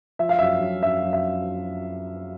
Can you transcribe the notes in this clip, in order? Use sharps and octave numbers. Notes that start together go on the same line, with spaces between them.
F3 E5
F5
F#2 E5
F#2
F#2 E5
F#2
E5